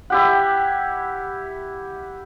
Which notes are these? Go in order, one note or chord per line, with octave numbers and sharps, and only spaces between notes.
E4 G4 F#5